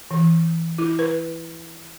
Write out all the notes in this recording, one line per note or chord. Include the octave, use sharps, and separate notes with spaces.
E3
E4
B4